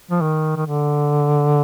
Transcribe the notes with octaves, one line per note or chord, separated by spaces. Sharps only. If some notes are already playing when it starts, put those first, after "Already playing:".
F3
D#3
D#3
D3